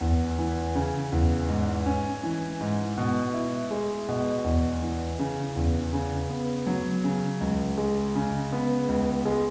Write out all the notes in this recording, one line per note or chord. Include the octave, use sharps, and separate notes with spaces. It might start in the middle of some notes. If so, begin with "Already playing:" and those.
E2
E3
C#3
E2
G#2
C#4
E3
G#2
B2
E4
G#3
B2
E2
E3
C#3
E2
C#3
B3
F#3
C#3
C#2
G#3
C#3
B3
C#2
G#3